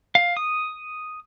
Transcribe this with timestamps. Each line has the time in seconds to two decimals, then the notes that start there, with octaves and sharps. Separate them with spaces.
0.15 F5
0.37 D#6